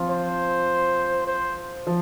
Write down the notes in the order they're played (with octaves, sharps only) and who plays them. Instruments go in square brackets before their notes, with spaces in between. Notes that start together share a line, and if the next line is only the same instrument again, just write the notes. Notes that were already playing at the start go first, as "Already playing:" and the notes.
Already playing: [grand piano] F3 C4 F4
[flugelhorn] C5
C5
[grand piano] F3